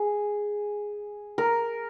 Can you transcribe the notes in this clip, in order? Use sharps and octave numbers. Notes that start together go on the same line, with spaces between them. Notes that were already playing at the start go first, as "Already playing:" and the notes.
Already playing: G#4
A#4